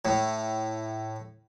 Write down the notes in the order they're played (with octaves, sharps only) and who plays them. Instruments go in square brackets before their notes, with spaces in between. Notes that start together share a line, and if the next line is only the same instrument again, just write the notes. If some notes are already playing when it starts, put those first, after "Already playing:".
[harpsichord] A2